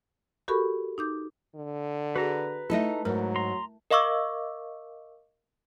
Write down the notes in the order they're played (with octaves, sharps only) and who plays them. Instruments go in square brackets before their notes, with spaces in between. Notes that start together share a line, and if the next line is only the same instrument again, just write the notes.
[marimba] F#4 G4 A4 A#4 B5 C#6
D#4 D6 G6
[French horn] D3
[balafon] F#4 G#4 [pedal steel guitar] B4 A#5
[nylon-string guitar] A3 D#4 A4 [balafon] E4 E5
[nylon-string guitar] G#2 [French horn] F#3 [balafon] A#4
[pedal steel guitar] A#5 C6
[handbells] A#4 D#5 F5 C#6 D6 E6